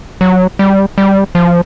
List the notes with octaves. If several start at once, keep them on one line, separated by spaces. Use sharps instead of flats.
F#3
G3
G3
F3